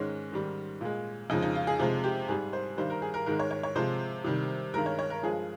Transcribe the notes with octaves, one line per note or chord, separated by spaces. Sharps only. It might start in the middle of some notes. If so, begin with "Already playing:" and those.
Already playing: G#2 D#3 G#3 C#4
G#2 D#3 G3
A#2 G#3
F2 C#3 F3 G#3 D#4
D#4
F4
G#4
C3 F3 G#3
G4
G#2 G3 G#4
C5
G2 D#3 G3 C5
A#4
G#4
A#4
G#2 D#3 G#3 A#4
C#5
C#5
C#5
C3 F3 G#3 C5
C3 D#3 G3
G2 D#3 G#3 A#4
C#5
C#5
A#4
G2 F3 G#3 G#4